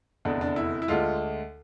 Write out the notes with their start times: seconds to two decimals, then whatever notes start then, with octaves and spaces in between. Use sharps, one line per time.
0.25 F1 E2 D3 D4
0.41 D4
0.56 E4
0.82 E4
0.88 D2 D3 G#3 F4